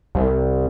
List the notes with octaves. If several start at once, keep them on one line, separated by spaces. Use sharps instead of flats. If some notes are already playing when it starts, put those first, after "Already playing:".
C2